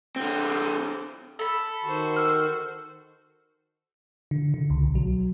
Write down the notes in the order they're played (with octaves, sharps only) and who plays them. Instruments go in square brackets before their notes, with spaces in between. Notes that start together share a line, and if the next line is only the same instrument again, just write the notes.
[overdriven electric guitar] D3 C4
[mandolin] A4 B5
[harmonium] D#3 [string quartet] F#4 C5
[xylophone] E6 F6
[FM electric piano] D3
D3
C#2
B1
F#3